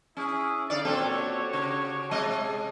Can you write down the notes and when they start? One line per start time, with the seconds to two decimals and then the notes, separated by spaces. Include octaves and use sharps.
0.17 C#4 E4 G#4
0.70 D3 D5 F5
0.85 A#2 C4 F#4 G4 A4 C#5
1.53 C#3
2.11 C3 G#3 D#5